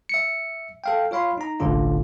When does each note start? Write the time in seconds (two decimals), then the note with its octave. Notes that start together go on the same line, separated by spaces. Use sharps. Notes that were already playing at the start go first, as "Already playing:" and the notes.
0.09 E5 C#7
0.84 A4 F5 G5
1.11 F4 C#5 F5 B5 C6
1.38 D#4 A#5
1.60 G1 C2 A2 D3 C#4 F4